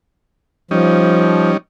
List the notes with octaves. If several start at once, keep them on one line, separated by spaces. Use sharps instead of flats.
F3 G3 C#4 D#4